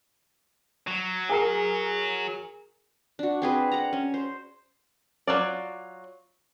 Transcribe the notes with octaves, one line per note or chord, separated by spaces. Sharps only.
F#3
G#4 A#4 C7
D4 F#4
C4 G#4 B4
F#5 A#5
C#4
C5
F#3 F4 D5